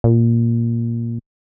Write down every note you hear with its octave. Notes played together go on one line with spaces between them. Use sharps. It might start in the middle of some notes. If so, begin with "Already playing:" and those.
A#2